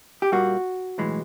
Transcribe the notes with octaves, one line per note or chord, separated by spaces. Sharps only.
G4
A#2 G3 A#3 F#4
B1 A2 E3 G#3